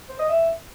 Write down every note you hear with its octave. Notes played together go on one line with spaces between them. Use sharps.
C5
D#5
E5